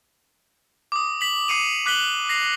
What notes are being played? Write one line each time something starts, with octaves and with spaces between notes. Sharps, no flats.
D6 D#6
B6 F#7
D6 C7 C#7 D#7 F7
D6 F#6 B6 F#7 G7
A#6 C7 F7